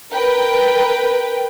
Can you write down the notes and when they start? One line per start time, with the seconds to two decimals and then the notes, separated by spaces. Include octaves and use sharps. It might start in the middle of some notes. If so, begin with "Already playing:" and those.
0.11 A#4 B4 G5